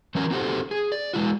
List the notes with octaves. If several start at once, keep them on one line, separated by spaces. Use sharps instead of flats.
E3 F#3 C#4 A#4 A#5
C4 D#4 F#4 G4 A4 C5
G#4
D5
G#3 E4 F#4